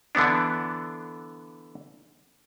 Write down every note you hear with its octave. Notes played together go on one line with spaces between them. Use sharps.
D3 E3 B3 D4